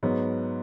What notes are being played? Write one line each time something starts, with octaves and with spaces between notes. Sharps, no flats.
G#2 F#3 B3